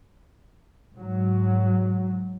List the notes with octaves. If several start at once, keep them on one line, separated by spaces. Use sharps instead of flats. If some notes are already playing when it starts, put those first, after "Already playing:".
G#2 F#3